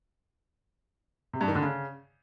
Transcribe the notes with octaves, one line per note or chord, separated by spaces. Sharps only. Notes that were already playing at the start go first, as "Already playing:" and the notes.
C3
G2
D#3
D3
C#3